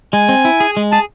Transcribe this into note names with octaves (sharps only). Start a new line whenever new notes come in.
G#3 G#5
C4
E4
G#4
G#3
G#4 A5